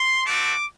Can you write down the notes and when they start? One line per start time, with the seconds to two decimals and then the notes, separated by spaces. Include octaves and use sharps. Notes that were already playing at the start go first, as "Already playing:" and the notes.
Already playing: C6
0.26 A3 C4 F#4 D6